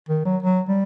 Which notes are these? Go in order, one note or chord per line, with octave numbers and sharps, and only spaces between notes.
D#3
F#3
F#3
G3